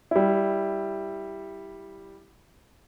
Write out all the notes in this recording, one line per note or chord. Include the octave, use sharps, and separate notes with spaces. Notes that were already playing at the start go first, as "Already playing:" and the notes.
G3 E4